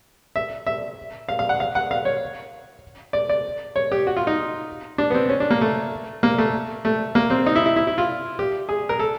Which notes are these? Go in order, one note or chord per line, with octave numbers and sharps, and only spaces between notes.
E5
E5
F5
F5
F#5
F5
F#5
F5
C#5
D5
D5
C#5
G4
F#4
F4
D#4
D4
B3
C4
C#4
D4
A#3
A3
A#3
A3
A3
A#3
C4
D#4
E4
E4
E4
E4
F4
G4
G#4
A#4
A4